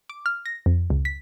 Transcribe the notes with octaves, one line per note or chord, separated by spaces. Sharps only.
D6
F6
A#6
F2
C#2
B6